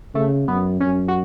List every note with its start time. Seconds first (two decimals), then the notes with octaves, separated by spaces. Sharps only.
0.14 C#3 A3
0.47 F#2 B3
0.80 F#2 C#4
1.08 F#4